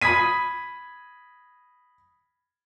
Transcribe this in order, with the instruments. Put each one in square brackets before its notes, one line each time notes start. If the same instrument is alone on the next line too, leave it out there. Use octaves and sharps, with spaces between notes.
[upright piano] B5 D#6 G#6 B6 D#7